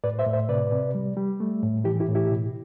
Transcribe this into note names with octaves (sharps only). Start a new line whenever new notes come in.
A2 B4 D5
C5 E5
A2
C5 E5
C3 B4 D5
C3
G3
G3
A3
A2
E3 E4 G4
E4 G4
A2
E4 G4
B2